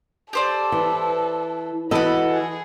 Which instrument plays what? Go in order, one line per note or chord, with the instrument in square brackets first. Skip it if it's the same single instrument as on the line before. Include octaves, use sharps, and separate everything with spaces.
[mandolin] G4 C5 D5 [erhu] A4
[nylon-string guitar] E3
[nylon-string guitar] E3 F#4 D#5 [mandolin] A4 F#5 [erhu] B5
[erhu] G#4